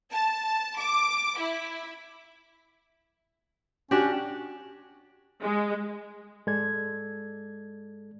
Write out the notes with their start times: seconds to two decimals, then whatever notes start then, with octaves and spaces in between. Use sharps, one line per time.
0.12 A5
0.79 D6
1.38 E4
3.91 C#4 D4 F#4 G4
5.42 G#3
6.47 G#2 G#3 A4 D5 G#6